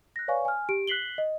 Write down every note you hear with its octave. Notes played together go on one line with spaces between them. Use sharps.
F#6 A#6
B4 C#5 D5 F5 G#5 C#6
G#5 F6
G4 D7
F#6 B6 C7 F#7 G7
D#5